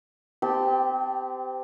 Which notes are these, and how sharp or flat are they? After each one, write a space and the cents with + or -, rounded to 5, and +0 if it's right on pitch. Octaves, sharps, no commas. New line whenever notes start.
C4 -30 G4 +0 A5 +0